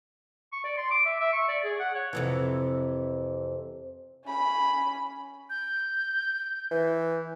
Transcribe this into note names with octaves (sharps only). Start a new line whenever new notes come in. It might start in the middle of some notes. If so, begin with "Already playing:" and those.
C#6
D5
C6
D6
E5
E5
C#6
D5
G#4
F#5
C#5
F2 C3 E3
C#4 B5
G6
E3